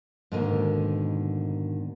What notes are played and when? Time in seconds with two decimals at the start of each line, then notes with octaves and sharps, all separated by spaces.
0.32 G#2 B2 D3 D#3 A#3 D#4